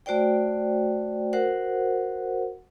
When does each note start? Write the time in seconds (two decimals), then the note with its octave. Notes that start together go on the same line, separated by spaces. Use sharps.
0.06 A3 F#4 C5 D5 G5
1.33 F#4 A#4 C5 F#5